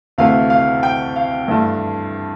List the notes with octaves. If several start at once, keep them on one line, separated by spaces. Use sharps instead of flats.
D2 C3 E3 A3 F5
F5
G5
F5
G2 E3 A3